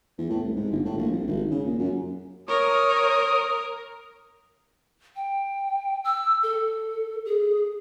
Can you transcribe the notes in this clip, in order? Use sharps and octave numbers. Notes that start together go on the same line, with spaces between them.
E2
A2
C2
G#2
G1
A2
A#1
C2
G#1
C#3
A#2
F#2
A#4 C#5 D#6
G5
E6
A4
G#4